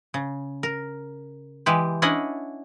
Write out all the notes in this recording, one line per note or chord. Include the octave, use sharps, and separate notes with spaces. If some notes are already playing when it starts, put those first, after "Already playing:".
C#3
A#4
E3 G#3 G4 B4
C#4 D4 E4 D#5 F#5